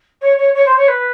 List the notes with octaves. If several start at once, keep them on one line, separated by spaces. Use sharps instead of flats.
C#5
C#5
C#5
C5
C#5
B4